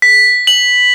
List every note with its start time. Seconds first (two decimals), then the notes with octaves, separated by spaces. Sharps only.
0.02 B6
0.47 F#7